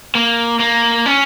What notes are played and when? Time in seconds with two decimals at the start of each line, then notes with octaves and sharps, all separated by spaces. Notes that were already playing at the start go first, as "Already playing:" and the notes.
0.15 A#3
0.60 A#3
1.06 C#4